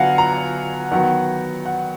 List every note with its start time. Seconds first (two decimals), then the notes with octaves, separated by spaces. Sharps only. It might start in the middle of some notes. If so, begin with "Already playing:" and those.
Already playing: D3 F#3 B3 F5 F#5 G#5
0.18 A#5
0.91 D#3 F#3 B3 F#5
1.66 F#5